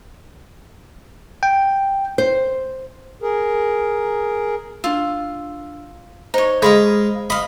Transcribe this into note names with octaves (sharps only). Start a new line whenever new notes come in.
G5
C5
G#4 A#4
D4 F4 E6
D#4 C5 C#5 A#5
G#3 D#5 F5 B5
D#5 F5 B5